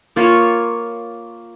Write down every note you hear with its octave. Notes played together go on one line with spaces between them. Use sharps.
A#3 F4 C#5